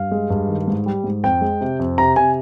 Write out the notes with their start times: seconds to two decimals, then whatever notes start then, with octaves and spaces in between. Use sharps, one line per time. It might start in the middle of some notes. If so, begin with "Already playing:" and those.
Already playing: G2 F5
0.11 G#3
0.30 G2
0.49 D#3
0.68 G#2
0.86 G3
1.04 G#2
1.23 F2 G5
1.41 G#3
1.61 C3
1.79 F2
1.98 C3 A#5
2.16 C3 G#5